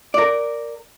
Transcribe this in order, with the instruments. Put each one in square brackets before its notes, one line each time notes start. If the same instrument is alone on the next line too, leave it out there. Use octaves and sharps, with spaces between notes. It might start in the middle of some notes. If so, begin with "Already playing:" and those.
[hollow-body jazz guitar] A#4 D5